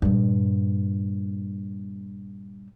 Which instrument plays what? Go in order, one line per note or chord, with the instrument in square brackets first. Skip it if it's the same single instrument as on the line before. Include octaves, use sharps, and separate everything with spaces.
[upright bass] G2 A#2